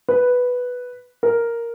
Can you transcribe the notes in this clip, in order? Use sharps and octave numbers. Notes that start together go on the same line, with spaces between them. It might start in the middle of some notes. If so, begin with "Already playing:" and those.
B4
A#4